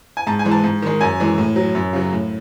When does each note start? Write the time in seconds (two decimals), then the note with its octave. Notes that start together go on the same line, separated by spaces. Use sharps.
0.17 G#5
0.27 G#2 A5
0.39 G#5
0.45 E3 G#3
0.51 A5
0.64 G#2
0.82 D#3 G#3
1.01 F#2 G#5
1.20 E3 G#3
1.38 A2
1.56 F#3
1.75 F#2
1.93 C#3 F#3
2.12 A2